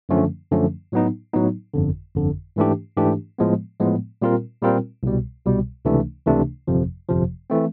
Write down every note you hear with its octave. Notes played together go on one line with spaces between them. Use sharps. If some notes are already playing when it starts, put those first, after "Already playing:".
F#2 D3 F3 A3 C#4
F#2 D3 F3 A3 C#4
A2 F#3 B3 D#4
A2 F#3 B3 D#4
G1 F2 D3
G1 F2 D3
G#2 E3 A3 D4 G4
G#2 E3 A3 D4 G4
A2 F3 G#3 B3
A2 F3 G#3 B3
A#2 G3 C4 F4 A#4
A#2 G3 C4 F4 A#4
C2 B2 G3
C2 B2 G3
C#2 C3 E3 A3 D4
C#2 C3 E3 A3 D4
G1 F2 C3 F3
G1 F2 C3 F3
E3 A3 C4